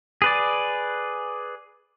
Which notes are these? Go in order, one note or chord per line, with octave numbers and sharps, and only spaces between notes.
G#4 B4 D5